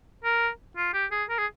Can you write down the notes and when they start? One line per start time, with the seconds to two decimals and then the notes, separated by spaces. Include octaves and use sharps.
0.25 A#4
0.77 F4
0.94 G4
1.12 G#4
1.29 A#4
1.39 G#4